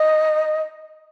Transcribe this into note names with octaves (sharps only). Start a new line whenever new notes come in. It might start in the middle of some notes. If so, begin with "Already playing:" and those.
Already playing: D#5